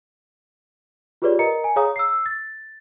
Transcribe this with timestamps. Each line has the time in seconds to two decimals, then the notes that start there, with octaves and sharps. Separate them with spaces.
1.22 F4 G4 G#4 B4 C#5 D5
1.39 A#4 D#5 A#5 C#7
1.64 G#5
1.76 G#4 C#5 F5 A#5 D#6
1.96 E6 C7
2.26 A6